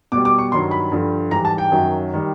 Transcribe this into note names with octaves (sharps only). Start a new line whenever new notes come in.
B2 G3 D6
D6
C#6
G2 D#3 F#3 C6
B5
G2 D3 F3
G#2 E3 G3 A#5
A5
G5
F#2 D#3 F#3
D#3 G3